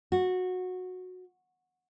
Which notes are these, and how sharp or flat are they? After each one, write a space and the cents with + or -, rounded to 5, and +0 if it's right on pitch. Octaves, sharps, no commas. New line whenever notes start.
F#4 -15